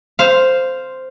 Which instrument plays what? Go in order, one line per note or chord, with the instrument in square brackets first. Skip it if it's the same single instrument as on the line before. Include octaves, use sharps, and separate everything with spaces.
[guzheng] C5 F5